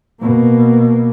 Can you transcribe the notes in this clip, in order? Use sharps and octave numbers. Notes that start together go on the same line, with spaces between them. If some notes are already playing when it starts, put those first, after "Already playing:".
B2 A#3